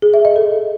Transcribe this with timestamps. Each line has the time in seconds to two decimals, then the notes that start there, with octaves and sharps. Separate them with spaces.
0.02 G#4
0.14 E5
0.25 D#5
0.36 A4